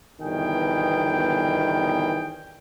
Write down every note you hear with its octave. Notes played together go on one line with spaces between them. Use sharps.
G1 B2 D#3 E3 G#4 G5